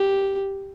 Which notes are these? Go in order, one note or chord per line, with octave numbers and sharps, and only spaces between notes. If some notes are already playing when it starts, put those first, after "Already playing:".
Already playing: G4